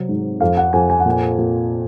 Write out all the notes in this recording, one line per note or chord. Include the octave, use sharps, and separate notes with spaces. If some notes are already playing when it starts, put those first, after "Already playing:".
Already playing: C3 F#3
G#2
F2 F5
F#5
F2 G#5
G#5
F#5
A#2 G#5
A#2